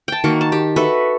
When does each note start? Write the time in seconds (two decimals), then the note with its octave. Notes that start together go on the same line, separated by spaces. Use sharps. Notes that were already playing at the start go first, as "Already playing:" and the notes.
0.08 G5 A5
0.24 D#3 A#3 F#4
0.41 A5
0.52 G4
0.76 F#4 A4 B4 E5